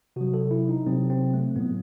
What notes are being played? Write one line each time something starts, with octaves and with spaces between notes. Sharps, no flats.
C3 F#3 F#4
A4
E4
D#4
C3 F#3 C4
C4
A3
A2 F#3 B3